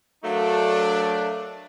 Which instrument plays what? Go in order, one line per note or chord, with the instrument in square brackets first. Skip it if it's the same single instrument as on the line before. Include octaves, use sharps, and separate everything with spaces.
[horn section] F#3 A3 D4 [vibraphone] A4 A#4 F5